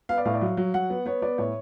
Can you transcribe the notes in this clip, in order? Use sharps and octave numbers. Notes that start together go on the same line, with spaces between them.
B3 F5
D5
A2 F5
D5
F#3 F5
F#3
F#3 F#5
B3
B3 C#5
B3 D5
A2 C#5